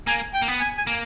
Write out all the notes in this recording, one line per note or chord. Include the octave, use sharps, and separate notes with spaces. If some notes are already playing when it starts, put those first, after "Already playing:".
A#3 G#5
G5
A#3
B3
G#5
G#5
A#3